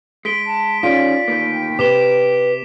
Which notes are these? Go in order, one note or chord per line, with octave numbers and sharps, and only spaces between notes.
G#3 B6 D7 G7
A5
D#3 C#4 F4 G#4 D5 B6 D7
D2 D#3 A#3
G5
C3 B4 D6 E7 G7